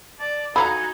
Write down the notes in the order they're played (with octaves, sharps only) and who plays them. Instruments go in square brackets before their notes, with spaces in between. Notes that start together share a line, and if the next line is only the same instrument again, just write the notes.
[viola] D5 [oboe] A5
[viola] D#4 F#4 [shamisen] A4 F5 A#5 [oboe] G#5 [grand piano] B5